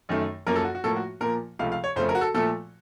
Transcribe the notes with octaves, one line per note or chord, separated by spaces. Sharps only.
F#2 D#3 A3
F#2 F3 A#3 A#4
A4
F#4
F#4
A2 F3 A#3 A4
F#4
A#2 F3 A#3 A#4
C#2 C3 F3 A3 F5
F5
C#5
F2 C#3 A3 C5
A#4
F#4
A4
A#2 F3 A3 A4